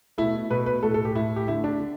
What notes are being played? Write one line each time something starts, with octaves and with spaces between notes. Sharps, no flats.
B2 A3 E4
B2 A3 B4
B4
A2 A3 A4
A4
G4
A2 A3 E4
G4
D3 A3 E4
D4
D3